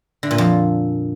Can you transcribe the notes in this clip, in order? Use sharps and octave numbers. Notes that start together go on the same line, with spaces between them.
D3
A#2
F2